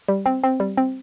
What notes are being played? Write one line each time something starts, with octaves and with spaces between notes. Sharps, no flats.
G3
C4
C4
G3
C4